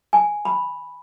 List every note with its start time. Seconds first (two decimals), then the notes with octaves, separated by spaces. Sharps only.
0.13 G#5
0.45 B5